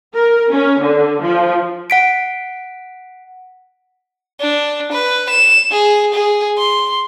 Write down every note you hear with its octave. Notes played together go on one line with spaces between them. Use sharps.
A#4
C#4
D3
F3
F#5 B6 D7
D4
B4
E7
G#4
G#4
C6